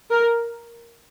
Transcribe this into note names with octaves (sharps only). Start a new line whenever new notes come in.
A#4